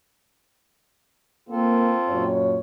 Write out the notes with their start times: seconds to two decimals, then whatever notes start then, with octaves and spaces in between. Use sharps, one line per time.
1.49 A#3 C4 F4 A4
2.09 F#2 A#2 C#5